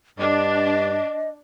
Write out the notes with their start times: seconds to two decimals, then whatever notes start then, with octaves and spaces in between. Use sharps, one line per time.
0.19 G2 D4 D#5